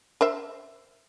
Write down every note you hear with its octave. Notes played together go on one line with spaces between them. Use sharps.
A#4 C5 E5